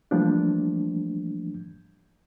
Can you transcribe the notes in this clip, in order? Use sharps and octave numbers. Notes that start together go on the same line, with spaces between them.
E3 F3 G3 A3 A#3 D4